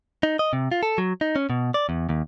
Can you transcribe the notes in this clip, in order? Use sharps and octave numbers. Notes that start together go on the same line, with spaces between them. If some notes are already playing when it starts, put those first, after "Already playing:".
D#4
D#5
C3
F4
A4
F#3
D#4
C#4
B2
D5
E2
D#2